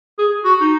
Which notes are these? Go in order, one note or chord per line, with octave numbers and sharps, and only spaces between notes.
G#4
F#4
D#4